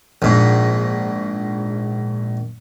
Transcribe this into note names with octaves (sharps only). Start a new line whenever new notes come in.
A#1 G#2